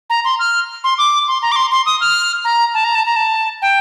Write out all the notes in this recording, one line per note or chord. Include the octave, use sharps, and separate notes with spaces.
A#5
C6
F6
C6
D6
C6
A#5
D6
C6
C6
D#6
F6
A#5
A5
A#5
A5
A#5
A5
G5